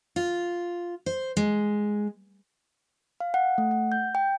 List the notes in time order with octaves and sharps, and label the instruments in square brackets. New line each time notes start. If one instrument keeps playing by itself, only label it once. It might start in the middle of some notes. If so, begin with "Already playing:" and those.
[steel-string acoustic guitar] F4
C5
G#3
[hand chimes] F5
F#5
A3
F#5
G6
G5